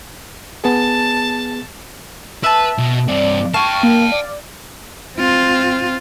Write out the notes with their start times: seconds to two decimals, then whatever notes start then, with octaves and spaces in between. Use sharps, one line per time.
0.64 B3 G#4 A5
2.43 B4 E5 A5
2.78 B2
3.08 G2 C4 D5
3.54 F5 G5 A5 C#6
3.83 A#3
4.12 D5
5.16 C4 F4